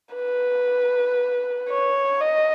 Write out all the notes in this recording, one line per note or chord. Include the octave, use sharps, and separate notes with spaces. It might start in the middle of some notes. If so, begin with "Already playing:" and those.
B4
C#5
D#5